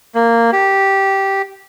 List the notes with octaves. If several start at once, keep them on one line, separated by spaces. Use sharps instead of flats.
A#3
G4